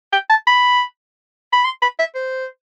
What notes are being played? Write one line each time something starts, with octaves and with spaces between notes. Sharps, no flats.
G5
A5
B5
B5
C6
B5
E5
C5